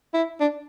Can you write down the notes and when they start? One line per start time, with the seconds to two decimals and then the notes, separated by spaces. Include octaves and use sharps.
0.14 E4
0.41 D4